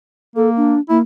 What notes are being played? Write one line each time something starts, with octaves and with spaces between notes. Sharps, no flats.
A#3 A4
D4
A#3 E4